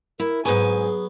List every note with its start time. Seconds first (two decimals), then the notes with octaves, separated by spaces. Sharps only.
0.20 E4 A#4
0.45 G#2 F#3 B3 G#4 G#5